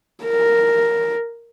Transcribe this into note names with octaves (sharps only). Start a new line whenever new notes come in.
A#4